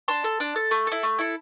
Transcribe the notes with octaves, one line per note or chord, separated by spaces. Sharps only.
D4 A5 C6
A4
D4
A4
A3
E4 A4
A3
E4 A4